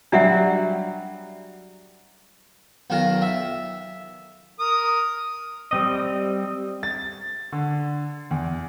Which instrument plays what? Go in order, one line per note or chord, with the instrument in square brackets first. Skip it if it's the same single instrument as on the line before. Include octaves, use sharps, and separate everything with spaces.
[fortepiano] F#3 G3 [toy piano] D4 E5 F#5
[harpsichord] B1 D#3 F4 A#5
E5
[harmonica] A#4 D#6
[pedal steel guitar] G3 C4 D#5
[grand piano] A6
D3
E2